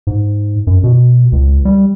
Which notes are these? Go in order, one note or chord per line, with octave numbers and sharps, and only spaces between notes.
G#2
F#2
B2
C#2
G3